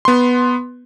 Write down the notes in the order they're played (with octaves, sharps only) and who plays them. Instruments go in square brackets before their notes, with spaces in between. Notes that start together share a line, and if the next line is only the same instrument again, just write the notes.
[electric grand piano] B3 C6